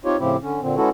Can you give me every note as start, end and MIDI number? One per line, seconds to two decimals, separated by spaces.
0.05 0.17 60
0.05 0.17 63
0.05 0.17 65
0.05 0.17 67
0.05 0.17 73
0.20 0.37 45
0.20 0.37 49
0.20 0.37 53
0.20 0.37 60
0.20 0.37 64
0.20 0.37 67
0.42 0.61 50
0.42 0.61 61
0.62 0.76 46
0.62 0.76 50
0.62 0.76 60
0.77 0.89 56
0.77 0.89 59
0.77 0.89 61
0.77 0.89 64
0.77 0.89 66
0.77 0.89 69